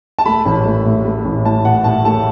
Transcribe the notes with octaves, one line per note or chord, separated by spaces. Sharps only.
A5
A3 B5
A1
A3
A2
A3
A1
A2 A5
A2 F#5
A2 A5
A3 A5